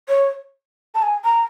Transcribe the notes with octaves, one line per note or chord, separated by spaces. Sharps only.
C#5
A5
G#5
A#5